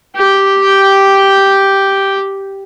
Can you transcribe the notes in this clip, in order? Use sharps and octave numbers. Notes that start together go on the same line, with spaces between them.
G4 G5